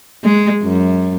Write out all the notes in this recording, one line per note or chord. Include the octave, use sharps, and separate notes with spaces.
G#3
F#2